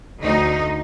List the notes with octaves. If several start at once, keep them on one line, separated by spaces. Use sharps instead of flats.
D2 D#4